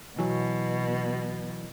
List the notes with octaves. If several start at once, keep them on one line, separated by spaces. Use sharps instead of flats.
B2 E3 F#3